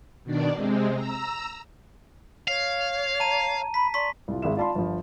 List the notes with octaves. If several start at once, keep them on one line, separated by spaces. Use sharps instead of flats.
B2 D#3 D4 D5
C3 G#3 C4
A#5 E6
C#5 F5
A5 A#5 D#7
B5 B6
D5 C6 C#6 B6
C2 F4
G#1 D#3 G#3 E5 E7
F4 D5 A5 B5 C6
G1 F3